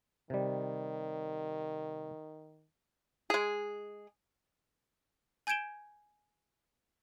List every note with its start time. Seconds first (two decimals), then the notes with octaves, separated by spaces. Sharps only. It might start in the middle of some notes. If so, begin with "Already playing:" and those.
0.30 C3 D#3 G3
3.30 G#3 G#4
5.47 G#5 G6 G#6 D7 E7 G7